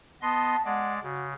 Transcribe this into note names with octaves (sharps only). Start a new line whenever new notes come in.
B3 D#5 A5 C6
G#3 D5 F#5
C#3 F#4